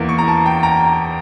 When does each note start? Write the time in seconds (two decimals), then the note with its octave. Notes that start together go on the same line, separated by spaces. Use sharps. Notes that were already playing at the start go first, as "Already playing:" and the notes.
Already playing: E2 E3 A#3
0.09 C#6
0.18 A#5
0.28 A5
0.46 G5
0.63 A#5